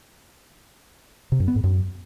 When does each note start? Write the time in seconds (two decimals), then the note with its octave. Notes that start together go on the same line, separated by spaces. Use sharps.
1.32 C3
1.40 F#2
1.48 B3
1.56 G#2
1.64 F#2